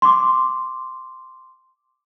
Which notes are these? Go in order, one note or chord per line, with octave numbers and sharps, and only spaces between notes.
C6 D6